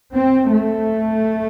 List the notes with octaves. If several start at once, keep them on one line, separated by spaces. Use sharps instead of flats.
C4
A3